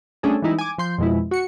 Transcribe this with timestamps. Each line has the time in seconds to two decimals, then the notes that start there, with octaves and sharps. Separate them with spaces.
0.23 G3 A3 C#4 D4 G#4 A4
0.42 E3 G3 G#3 D#4 E4
0.58 G#5 D6
0.78 F3 C6 G6
0.98 F2 B2 G#3 E4
1.31 F#4 C#7